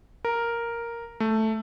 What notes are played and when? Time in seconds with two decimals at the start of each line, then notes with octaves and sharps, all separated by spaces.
0.25 A#4
1.20 A3